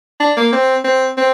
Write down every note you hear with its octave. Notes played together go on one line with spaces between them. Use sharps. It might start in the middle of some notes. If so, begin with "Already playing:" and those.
D4
A#3
C4
C4
C4